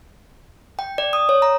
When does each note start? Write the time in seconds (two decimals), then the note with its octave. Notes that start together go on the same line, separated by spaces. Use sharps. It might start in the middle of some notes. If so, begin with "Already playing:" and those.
0.79 G5
0.98 D5
1.13 D#6
1.29 C#5
1.42 A#5